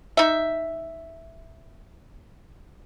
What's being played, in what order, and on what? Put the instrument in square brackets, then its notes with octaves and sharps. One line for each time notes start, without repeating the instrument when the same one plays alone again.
[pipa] D#4 E5